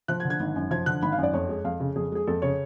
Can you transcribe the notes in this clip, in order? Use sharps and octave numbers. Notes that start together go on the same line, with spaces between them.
F3 F#6
G#6
D3
G#6
G#1
F#2
F3 G#6
D3 F#6
G#1 B5
F5
F#2 D5
F2 C#5
G#3
F2 F5
C#3
F2 G#4
G#3 G#4
F2 A4
C#3 C#5